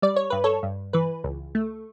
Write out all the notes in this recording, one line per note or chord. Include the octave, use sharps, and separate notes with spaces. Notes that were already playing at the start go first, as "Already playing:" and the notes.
G3 D5
C#5
G2 B4
A4 C#5
G2
E3 B4
C#2
A3